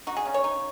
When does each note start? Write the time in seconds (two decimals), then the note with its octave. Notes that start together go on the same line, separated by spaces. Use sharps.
0.07 D#4 F#4
0.17 G#4
0.25 C#3
0.34 C#5
0.44 D#4